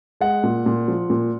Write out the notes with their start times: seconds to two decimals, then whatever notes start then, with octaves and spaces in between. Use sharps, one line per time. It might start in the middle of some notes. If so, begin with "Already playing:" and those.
0.21 G#3 F#5
0.43 A#2
0.66 A#2
0.88 F3
1.10 A#2